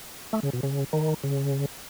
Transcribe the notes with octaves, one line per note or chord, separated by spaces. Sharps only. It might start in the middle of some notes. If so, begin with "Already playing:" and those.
A3
C#3
B2
C#3
D#3
C#3